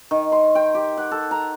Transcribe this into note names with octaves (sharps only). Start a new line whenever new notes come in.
D#3
C6
G5
G4
F#5
A4
A#5